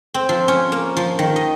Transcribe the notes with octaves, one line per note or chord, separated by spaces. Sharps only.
C4
F3
C#4
A#3
F3
D#3
D#5